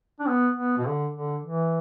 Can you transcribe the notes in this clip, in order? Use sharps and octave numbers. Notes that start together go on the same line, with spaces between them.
D4
B3
B3
B2
D3
D3
E3